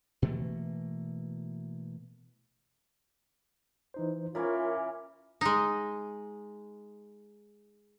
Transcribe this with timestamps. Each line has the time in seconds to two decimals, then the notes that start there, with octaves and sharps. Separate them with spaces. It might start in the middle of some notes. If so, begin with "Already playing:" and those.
0.22 B2 E3 A3 A#3
3.94 E3 D#4 C5
4.35 E3 A#3 C#4 F4 A#4 C#5
5.41 G#3 D#4